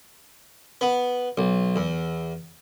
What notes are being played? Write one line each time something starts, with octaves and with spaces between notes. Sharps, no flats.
B3
B1
E2